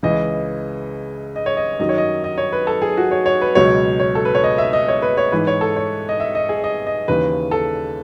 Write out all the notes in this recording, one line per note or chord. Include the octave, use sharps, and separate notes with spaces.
C#2 C#3 E3 D#5
D#5
C#5
D#5
F#2 D#3 F#3 D#5
C#5
D#5
D#5
C#5
B4
A4
G#4
F#4
C#5
C#5
B4
C#2 B2 F#3 C#5
C#5
A4
B4
C#5
D#5
E5
D#5
C#5
B4
C#5
G#2 E3 B4
C#5
A4
C#5
D#5
E5
D#5
G#4
D#5
D#5
D#2 C#3 E3 B4
A4